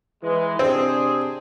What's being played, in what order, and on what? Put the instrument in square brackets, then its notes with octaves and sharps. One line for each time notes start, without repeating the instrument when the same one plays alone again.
[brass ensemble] E3 G#3
[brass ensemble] C3 D4 G#4 [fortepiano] C4